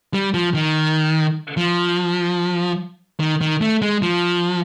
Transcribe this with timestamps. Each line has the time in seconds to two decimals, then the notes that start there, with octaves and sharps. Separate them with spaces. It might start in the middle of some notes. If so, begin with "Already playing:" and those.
0.14 G3
0.34 F3
0.54 D#3
1.57 F3
3.20 D#3
3.41 D#3
3.61 A3
3.82 G#3
4.02 F3